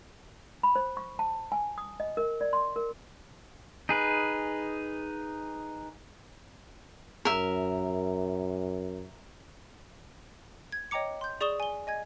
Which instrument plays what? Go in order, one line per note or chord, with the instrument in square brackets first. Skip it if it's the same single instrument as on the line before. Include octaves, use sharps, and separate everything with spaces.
[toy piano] B5
C5
C#6
A5
G#5
D#6
D#5
A#4
D5
C6
A#4
[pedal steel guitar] D#4 G#4 B4
[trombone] F#2 [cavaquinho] A#4 E5
[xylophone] G#6
C#5 D#5 G5 A#5 D6 C#7
C6 G6
G#4 D5 C#6 D#6 E7 G7
G#5 G7
D#5 G#5 G#6